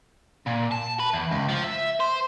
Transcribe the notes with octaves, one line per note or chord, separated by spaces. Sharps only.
A#2
A5
B4
E2
C#2
F3
E5
C5